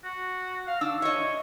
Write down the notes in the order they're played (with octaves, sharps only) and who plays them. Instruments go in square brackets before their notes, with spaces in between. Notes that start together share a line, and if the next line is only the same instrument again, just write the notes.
[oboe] F#4
F5
[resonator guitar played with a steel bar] D4 [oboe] E6
[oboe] C#5 [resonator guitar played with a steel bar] D#5 E5